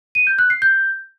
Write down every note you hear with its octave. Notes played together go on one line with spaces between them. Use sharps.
D#7
G6
F#6
C7
G6